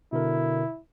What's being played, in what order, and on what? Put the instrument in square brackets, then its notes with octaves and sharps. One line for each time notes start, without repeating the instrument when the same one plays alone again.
[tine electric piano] B2 D3 A#4 [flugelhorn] E4